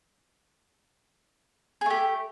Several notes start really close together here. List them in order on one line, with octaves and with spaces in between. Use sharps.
G#4 A3 G4